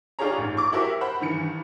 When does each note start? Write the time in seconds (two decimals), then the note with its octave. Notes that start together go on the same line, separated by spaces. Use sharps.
0.19 D4 F4 G4 G#4 C#5 A#5
0.38 A1 G#2
0.57 C#6 D6
0.72 E4 F#4 G4 A#4 C5 E5
1.01 C5 F#5 B5
1.20 G2 D#3 E3 C#7